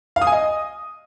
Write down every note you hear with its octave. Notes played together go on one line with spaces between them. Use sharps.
F5
D#6
G#5
D#5